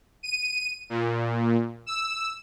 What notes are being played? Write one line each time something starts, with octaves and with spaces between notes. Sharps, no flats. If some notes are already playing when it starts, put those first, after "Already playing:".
D#7
A#2
E6